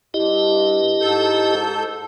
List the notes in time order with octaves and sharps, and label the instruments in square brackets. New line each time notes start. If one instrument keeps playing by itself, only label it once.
[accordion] G2 [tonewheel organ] E4 G4 D#5
[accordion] G#2 A4 G6